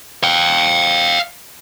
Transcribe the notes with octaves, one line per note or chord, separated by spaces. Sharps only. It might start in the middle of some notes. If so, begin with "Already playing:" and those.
F5 G5